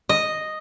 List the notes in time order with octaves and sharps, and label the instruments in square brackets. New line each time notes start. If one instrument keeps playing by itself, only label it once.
[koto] D#5